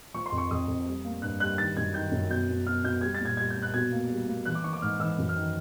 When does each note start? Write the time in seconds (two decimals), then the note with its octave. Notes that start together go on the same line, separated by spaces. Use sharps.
0.14 F3 C#6
0.26 C6
0.32 F2
0.38 C#6
0.51 F2 D#6
0.68 F2
0.86 G3
1.05 A#3
1.22 G2 F#6
1.40 G3 F#6
1.58 D#3 A6
1.77 F#2 G#6
1.94 D#3 G6
2.11 F#2
2.30 B2 G6
2.49 B2
2.67 B2 F6
2.84 B2 G6
3.01 G3 G#6
3.15 A6
3.20 A#2 G#6
3.37 G3 G#6
3.50 G6
3.56 A#2
3.62 F#6
3.74 B2 G#6
3.92 A#3
4.10 G3
4.28 A#3
4.45 E3 F#6
4.55 D6
4.64 E3 C#6
4.73 D6
4.82 G#2 F6
5.00 E3 E6
5.18 F#2
5.29 F6
5.36 D#3